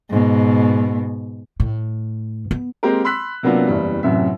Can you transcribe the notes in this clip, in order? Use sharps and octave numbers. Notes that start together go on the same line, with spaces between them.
G#2 B2
A2
B3
G#3 A#3 C4 G4 A#4
B5 C6 E6 F#6 B6
C3 F#3 A#3 B3 D4 F4
F#1 E2 G3
A1 F#2 C3 F#3 E5